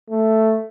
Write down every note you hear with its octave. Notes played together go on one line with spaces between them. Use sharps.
A3